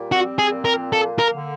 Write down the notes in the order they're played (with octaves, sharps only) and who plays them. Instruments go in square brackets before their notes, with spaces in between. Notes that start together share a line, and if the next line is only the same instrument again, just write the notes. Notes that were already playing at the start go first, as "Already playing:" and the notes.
Already playing: [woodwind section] A#2 G3
[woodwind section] C4 [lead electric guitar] F#4
[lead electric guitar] G#4
[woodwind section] A#2
[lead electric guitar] A#4
[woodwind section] A#3 [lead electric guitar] A4
[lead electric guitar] A#4
[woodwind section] D3